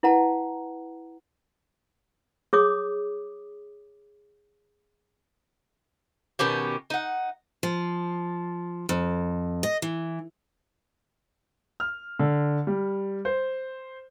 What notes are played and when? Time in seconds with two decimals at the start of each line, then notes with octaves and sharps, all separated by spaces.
0.03 E4 B4 F#5 A5 A#5
2.53 G#4 C#5 D6 D#6
6.39 B2 D#3 C#4 G4
6.90 D#4 F#5
7.63 F3
8.89 F2
9.63 D#5
9.82 E3
11.80 F6
12.19 D3
12.67 G3
13.25 C5